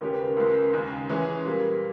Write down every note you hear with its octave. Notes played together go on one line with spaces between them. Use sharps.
D#2 C#3 G#3 C#4 G4 A#4
B4
A#4
C#2 C#3 G#3 A#4
D#2 C#3 G#3
E3 G#3 C#4 G#4 B4
A#2 G3 A#3